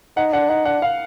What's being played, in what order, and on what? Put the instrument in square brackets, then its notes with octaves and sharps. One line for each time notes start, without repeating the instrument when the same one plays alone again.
[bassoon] D#4 [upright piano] F#5
[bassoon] D4 [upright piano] F#5
[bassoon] D#4 [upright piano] F#5
[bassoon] D4 [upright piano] F#5
[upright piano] F5